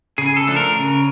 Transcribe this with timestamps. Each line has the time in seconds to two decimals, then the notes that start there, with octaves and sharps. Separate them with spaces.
0.18 C#3 G#4
0.37 A4
0.47 F3 A3 D4
0.56 A#4
0.76 C#3